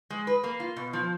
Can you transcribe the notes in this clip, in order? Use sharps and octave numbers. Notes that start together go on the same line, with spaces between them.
G#3
B4
A#3
F4
B2
F3